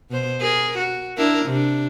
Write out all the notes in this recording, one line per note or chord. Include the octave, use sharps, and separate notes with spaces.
B2 C5
G#4 A#4
F#4
D4 E4 A#4
C3 D4